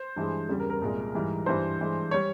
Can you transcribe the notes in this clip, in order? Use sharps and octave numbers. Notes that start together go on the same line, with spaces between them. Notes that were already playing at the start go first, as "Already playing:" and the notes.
Already playing: C5
G2 E3 G#3
E2 C#3 G3
A#4
A#4
C2 A#2 G#3
G#2 E3 G3
G2 E3 G3 C5
G2 E3 G#3
G3 C#5